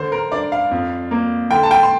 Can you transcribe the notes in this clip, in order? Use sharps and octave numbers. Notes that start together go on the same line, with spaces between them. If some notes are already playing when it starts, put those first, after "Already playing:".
Already playing: D3 C5
A#4
D4 D5
F5
F2
A#3
D3 G5
A5
G5
C6